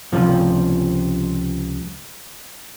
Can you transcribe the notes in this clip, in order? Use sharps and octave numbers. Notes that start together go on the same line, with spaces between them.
C#2 C3 F3